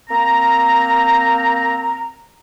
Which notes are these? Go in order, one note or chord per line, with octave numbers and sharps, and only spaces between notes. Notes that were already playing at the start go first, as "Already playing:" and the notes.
A#3 C4 A#5